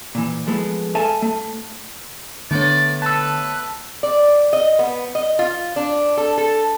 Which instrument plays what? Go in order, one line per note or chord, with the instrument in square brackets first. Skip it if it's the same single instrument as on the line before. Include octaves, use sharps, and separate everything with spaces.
[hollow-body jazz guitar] A#2 E3
F3 G#3 A3 B3
A4 E5 F5 G#5 A5
A3
[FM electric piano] D3 [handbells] A3 B3 C#5 [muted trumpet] D5
[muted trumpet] B4 [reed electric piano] A5 E6
[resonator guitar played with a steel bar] D5
D#5
B3
D#5
F4
D4
A4
A4